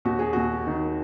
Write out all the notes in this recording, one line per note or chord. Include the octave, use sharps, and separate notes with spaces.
D#2 F#4
G#4
D#2 F#4
D#3